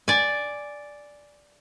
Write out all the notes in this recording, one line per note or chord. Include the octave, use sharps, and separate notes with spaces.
D5 G#5